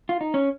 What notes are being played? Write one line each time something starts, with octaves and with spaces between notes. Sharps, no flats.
F4
D#4
C#4